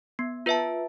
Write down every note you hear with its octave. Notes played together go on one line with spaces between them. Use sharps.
B3
F4 B4 E5 A5